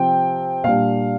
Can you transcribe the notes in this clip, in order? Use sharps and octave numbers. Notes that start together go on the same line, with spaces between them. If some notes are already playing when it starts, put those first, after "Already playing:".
Already playing: C3 F3 C4 G5
A#2 G3 D4 F5